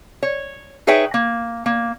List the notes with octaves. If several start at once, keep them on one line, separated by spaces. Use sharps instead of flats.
C#5
D#4 G#4 B4 C#5 E5 G5
A#3
A#3